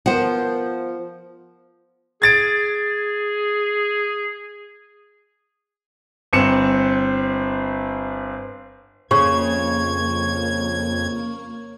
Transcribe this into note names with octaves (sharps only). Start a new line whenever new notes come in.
F3 B3 A#4 C5 F#5
G#4 G#6 A6 D7
G1 C4 C#7 E7
F2 C#3 A#3 C#5 G#6